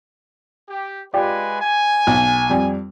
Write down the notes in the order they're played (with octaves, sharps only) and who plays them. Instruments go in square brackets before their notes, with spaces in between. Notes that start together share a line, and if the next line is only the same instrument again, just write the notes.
[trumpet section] G4
[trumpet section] G#3 B4 G#5 [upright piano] F4 G4 D5
[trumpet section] G#5
[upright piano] B1
F2 G3